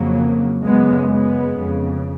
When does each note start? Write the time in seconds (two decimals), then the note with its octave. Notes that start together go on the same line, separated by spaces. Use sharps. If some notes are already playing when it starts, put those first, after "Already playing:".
Already playing: F2 C#3 F#3 A#3
0.65 F#2 C#3 G#3 B3
1.07 G#3 B3
1.49 F2 C#3